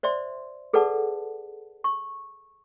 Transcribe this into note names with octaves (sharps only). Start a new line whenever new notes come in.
C5 D5 E5 C6
G#4 A4 B4 D5 F#5 A5
C#6